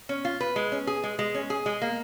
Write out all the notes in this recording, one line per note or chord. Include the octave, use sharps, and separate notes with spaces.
C#4
F4
B4
G#3
C#4
G#4
G#3
G#3
C#4
G#4
G#3
A#3